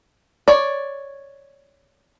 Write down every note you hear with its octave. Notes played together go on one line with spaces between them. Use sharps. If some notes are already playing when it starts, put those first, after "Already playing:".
C#5 D5